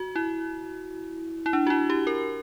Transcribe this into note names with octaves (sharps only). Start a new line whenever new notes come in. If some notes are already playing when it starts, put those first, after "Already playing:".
Already playing: F#4
E4
E4
D4
F#4
E4
G4
A#4